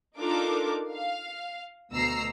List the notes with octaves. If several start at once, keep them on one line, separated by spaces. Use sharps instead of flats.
D4 D#4 F4 A4 A#4 D6
F5
D2 B2 A3 A#5 E6 C7